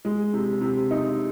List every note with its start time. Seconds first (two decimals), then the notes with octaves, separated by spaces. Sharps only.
0.05 G#3
0.33 C3
0.61 C3
0.91 D#4